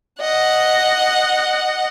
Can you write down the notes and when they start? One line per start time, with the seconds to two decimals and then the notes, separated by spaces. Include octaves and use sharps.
0.20 D#5 F#5